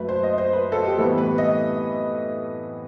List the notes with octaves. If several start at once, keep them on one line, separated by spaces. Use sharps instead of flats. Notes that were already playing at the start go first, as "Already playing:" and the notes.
Already playing: F#2 F#3 A3 B4
C5
D#5
C5
B4
A4
G4
A2 E3 G3 B3 A4
B4
D#5